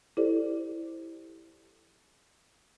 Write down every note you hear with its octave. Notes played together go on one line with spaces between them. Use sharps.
E4 G4 A4 C5 D5